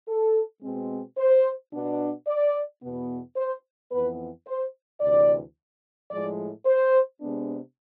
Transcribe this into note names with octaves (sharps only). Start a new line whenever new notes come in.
A4
B2 G#3 C4
C5
B2 B3 D4
D5
E2 B2 B3
C5
F2 E3 B3 B4
C5
D2 C3 E3 D5
A2 F3 G#3 D5
C5
C3 G#3 B3 D4